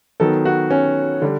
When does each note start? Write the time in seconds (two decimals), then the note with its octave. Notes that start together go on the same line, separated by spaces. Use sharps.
0.20 D#3 F#3 B3 A4
0.45 F#4
0.71 C#4
1.22 D3 G3